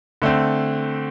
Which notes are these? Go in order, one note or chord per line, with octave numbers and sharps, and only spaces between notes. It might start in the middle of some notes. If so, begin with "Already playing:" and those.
D3 A3 C4